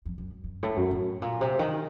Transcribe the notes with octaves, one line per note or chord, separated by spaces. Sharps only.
F2
F#2
F#2
A2
F#2
A2
A#2
C3
D#3